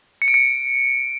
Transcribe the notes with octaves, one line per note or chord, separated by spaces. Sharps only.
C#7
D7
C#7